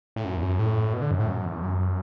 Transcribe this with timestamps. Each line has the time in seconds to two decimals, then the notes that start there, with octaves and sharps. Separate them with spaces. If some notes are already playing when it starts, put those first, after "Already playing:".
0.16 A2
0.25 F#2
0.37 E2
0.42 F#2
0.59 A2
0.93 B2
1.02 D3
1.11 F#2
1.19 A2
1.28 F#2
1.45 E2
1.63 F#2